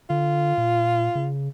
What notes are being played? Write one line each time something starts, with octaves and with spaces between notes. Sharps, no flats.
D3 F4
A#2
C#3